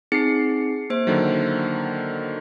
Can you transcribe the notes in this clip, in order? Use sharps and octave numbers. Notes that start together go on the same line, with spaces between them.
C4 D#4 G#4 C7 C#7
A#3 C5
D3 D#3 F#3